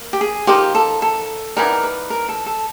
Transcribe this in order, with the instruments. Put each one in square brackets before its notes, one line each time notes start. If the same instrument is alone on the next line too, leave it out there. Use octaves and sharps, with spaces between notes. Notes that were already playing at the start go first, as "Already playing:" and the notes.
Already playing: [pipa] A#3
[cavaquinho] G4
G#4
[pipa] F3 A#3 D#4 [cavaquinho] G4
[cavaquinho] A4
A4
[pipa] E3 G3 B3 D#4 [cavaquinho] A#4
[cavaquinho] B4
A#4
A4
A4